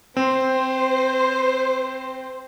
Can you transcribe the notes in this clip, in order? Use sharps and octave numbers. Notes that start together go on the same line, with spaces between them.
C4 C5